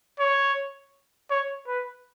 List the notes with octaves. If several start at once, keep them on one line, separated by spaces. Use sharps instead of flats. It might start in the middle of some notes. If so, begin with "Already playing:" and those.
C#5
C#5
B4